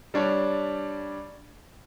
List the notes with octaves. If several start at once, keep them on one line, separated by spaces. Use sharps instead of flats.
G3 D4 C#5